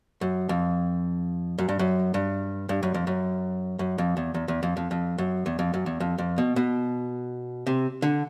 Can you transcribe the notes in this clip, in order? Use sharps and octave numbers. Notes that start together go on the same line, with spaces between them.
F#2
F2
F#2
G2
F#2
G2
G2
F#2
F2
F#2
F#2
F2
E2
E2
E2
F2
F2
F2
F#2
E2
F2
F#2
E2
F2
F2
B2
B2
C3
D3